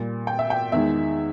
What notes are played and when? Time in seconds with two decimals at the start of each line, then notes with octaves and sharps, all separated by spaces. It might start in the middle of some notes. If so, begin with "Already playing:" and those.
Already playing: A#2 G3
0.27 G5
0.39 E5
0.50 G5
0.72 E2 D#3 G#3 E5